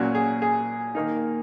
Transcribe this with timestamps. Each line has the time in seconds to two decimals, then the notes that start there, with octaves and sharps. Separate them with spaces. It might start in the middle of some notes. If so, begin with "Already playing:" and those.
Already playing: A#2 F#3 A#3 C#4 F#4
0.15 G#4
0.42 G#4
0.95 D#3 A#3 D#4